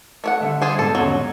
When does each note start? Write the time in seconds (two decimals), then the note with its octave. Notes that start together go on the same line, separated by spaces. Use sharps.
0.24 A3 C#5 F#5
0.41 D3 G3 E5
0.62 F4 G#4 C5
0.79 G#2 B2 G#3 A4
0.95 E2 D3 F#3 C#4
1.10 G3